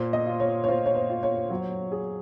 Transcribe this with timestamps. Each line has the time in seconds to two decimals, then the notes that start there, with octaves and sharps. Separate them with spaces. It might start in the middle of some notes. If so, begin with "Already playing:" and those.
Already playing: A#2 C5
0.13 D#5
0.26 F4
0.40 C#5
0.64 C#5
0.68 F4 C5
0.86 C#5
0.95 C5
1.10 F4
1.23 C#5
1.50 F#3
1.92 G#4